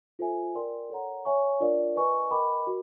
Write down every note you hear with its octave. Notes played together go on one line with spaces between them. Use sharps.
F4 A4 C5 E5 G#5
A#4 D5 G5 C6
A4 C#5 F#5 A#5
C#5 E5 G#5 C#6
D4 F4 A#4 D5 F5
B4 D#5 G#5 C#6
A#4 D#5 G5 B5 D6
F#4 A#4